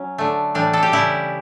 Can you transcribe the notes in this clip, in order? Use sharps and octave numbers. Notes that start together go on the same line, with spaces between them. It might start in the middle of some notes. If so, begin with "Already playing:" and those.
Already playing: F#3 C#4
D3 A3
A2 E3 G3 D4
A4
G4
C#3 G3 E4